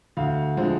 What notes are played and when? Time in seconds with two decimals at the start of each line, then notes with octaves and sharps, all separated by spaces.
0.17 D2 F5
0.57 D3 F3 G#3 C4